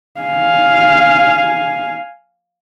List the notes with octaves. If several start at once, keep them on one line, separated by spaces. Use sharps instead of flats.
F5 G#5